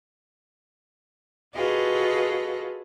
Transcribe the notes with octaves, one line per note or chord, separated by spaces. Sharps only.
F4 F#4 G#4 A4 B4 D#5